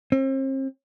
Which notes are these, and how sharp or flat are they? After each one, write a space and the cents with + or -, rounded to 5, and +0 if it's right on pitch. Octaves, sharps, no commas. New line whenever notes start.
C4 +40